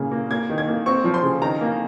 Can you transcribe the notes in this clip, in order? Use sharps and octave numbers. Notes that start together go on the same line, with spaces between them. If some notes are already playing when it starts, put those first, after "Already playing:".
Already playing: A#2 C#3 A#3
A#3
A#3 G#6
D#3
G#6
A#3
C4 C#6
F3
C6
C#3
D#3 A#5
A#3